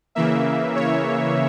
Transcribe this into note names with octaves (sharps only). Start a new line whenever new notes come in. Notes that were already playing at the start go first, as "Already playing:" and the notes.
C#3 E3 A#3 E5
C#5